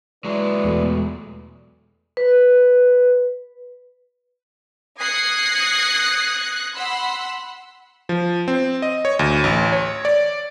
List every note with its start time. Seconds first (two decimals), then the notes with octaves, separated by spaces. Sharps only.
0.24 F#3 G#3 E4 B4 D5
0.64 E2 B2 A3
2.17 B4
4.99 D#6 F#6 G#6 A#6 C7 C#7
6.75 F#5 B5 C6 E6
8.09 F3
8.48 C4
8.82 D#5
9.05 C#5
9.19 D2
9.44 A1
9.72 C#5
10.05 D5